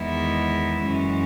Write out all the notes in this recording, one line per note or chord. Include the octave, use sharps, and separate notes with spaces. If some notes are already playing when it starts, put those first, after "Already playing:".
Already playing: E2 D#3 G#3 B3 E4
F#2 E3 G#3 C#4